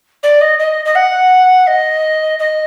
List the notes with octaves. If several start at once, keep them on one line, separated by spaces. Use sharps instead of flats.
D5
D#5
D#5
D#5
F#5
D#5
D#5